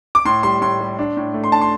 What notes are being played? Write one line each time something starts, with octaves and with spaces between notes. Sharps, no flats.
D6
A2 C6
G3 C6
A2 C6
G3
D4
A2
A3
C6
D4 A5
C6